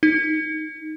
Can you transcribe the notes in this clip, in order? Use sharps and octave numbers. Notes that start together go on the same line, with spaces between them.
D#4